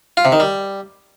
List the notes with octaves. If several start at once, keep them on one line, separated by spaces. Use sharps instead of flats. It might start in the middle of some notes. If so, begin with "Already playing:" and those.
F4
C3
D#3
G3